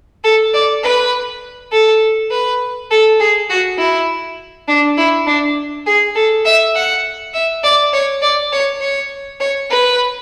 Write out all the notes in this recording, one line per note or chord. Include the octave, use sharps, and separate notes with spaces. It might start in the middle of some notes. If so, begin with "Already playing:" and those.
A4
D5
B4
A4
B4
A4
G#4
F#4
E4
D4
E4
D4
G#4
A4
E5
F#5
E5
D5
C#5
D5
C#5
C#5
C#5
B4